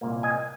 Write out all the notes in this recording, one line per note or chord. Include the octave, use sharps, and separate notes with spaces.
C2 A#2 A#3
D#5 G#5